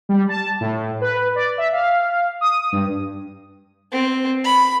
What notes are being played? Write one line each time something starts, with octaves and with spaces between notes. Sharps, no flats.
G3
A5
A2
B4
D5
E5
F5
D#6
G2
C4
B5